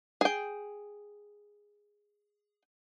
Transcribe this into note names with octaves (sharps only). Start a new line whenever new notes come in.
G#4 G5